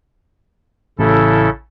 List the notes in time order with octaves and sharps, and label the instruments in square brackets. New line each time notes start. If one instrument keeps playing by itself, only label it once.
[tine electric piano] A1 [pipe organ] C#3 E4 A4